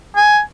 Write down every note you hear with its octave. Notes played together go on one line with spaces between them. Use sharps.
G#5